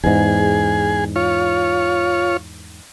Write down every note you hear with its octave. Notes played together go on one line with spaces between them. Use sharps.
E2 G#2 G#4
F4 C#5